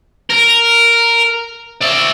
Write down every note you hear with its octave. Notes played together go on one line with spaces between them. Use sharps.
A#4
D5 E5